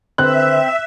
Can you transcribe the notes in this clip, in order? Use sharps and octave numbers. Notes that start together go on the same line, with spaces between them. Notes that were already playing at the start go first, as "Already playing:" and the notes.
D3 C4 B4 E5 F#6